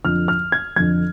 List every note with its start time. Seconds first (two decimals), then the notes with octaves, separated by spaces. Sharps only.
0.04 F2 D3 F3 F6
0.28 F6
0.52 G#6
0.76 F2 D3 F3 G#6